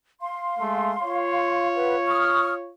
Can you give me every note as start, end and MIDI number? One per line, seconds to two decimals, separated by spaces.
0.21 1.68 77
0.21 1.68 84
0.59 0.94 56
0.59 0.94 57
1.03 2.71 65
1.03 2.71 73
1.75 1.95 71
1.75 1.95 78
2.07 2.52 85
2.07 2.52 87
2.07 2.52 89